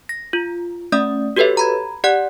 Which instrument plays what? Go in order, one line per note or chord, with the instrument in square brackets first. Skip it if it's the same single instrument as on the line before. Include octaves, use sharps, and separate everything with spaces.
[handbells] A#6
F4
A3 C#4 D5 E5 D#6
F#4 G4 A4 B4 C#5 E5
A#5 B5 G#6
G4 D5 F#5 F#6